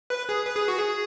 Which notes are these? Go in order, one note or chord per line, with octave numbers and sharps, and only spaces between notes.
B4
G#4
B4
G#4
F#4
G#4